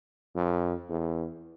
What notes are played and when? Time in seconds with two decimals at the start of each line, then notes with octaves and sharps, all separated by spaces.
0.35 F2
0.89 E2